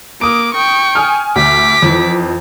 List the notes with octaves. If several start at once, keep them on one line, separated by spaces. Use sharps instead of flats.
A#3 D6 D#6 D7
G5 C#6
G#5 D#6 F6
D2 D6 B6
F2 E3